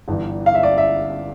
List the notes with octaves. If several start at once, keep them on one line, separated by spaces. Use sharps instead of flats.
G1 G2 E3
F5
E5
D5
E5